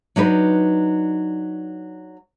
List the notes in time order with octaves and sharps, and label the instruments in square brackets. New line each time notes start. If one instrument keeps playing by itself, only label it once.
[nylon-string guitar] F#3 D4 D#4 B4